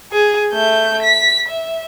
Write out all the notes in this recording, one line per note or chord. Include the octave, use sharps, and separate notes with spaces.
G#4
A3 G6
B6
E5